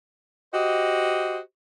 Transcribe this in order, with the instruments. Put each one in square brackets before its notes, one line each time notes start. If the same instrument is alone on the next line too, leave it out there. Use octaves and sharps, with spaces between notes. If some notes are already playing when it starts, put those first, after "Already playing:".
[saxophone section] F#4 G4 C5 D#5